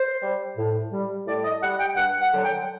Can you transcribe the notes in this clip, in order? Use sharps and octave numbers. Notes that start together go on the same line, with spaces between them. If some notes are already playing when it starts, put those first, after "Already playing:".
Already playing: C5
G3
A2
G3
A2 D5
D#5
G3 F#5
G5
G2 F#5
F#5
D3 F#3
G5